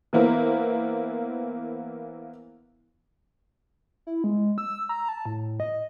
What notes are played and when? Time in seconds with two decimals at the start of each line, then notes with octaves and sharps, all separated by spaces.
0.13 E3 A#3 B3 E4 A#4 C5
4.07 E4
4.24 G#3
4.58 E6
4.89 A#5
5.09 A5
5.26 A2
5.60 D#5